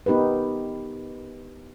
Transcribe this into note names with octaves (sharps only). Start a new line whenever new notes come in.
B3 D#4 G4 A#4 B4